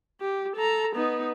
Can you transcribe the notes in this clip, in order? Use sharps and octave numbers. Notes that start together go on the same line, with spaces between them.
G4
A4 A#5
B3 D#4